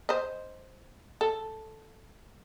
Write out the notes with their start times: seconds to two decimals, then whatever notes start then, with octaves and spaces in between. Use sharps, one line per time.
0.09 C5 D#5
1.21 A4